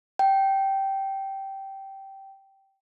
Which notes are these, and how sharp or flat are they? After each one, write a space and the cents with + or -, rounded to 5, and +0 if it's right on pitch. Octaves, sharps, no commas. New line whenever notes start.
G5 -10